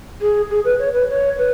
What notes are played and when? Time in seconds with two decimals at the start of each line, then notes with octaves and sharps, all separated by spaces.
0.21 G#4
0.50 G#4
0.65 B4
0.79 C#5
0.93 B4
1.09 C#5
1.38 B4